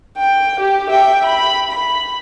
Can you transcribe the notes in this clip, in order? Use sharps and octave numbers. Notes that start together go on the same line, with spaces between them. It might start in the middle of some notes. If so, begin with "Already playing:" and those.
G5
G4
E5 G5
B5
B5